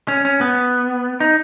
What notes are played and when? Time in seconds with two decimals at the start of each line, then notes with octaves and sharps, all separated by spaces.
0.08 C#4
0.25 C#4
0.41 B3
1.20 D#4